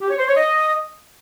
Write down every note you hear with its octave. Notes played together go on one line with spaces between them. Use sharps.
G4
C#5
C5
C#5
D#5